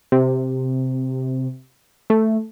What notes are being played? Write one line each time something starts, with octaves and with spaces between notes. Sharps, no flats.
C3
A3